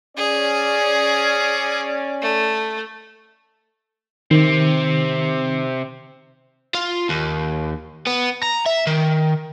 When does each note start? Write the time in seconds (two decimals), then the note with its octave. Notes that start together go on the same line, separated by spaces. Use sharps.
0.17 C#4 G#4 D5
2.21 A3
4.31 C3 D#3 C4
6.75 F4
7.09 D#2
8.07 B3
8.43 A#5
8.66 E5
8.87 D#3